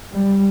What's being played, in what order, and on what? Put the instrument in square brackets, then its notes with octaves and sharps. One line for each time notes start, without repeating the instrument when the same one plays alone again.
[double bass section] G3